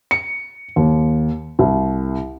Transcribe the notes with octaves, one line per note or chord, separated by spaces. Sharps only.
C#7
D#2
C2